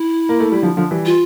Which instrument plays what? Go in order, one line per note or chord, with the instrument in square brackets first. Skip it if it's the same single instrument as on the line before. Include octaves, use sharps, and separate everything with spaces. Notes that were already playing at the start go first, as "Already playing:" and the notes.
Already playing: [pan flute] E4
[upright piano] A#3
A3
G3
D3 F3
D3 F3
E3 G3
[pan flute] F4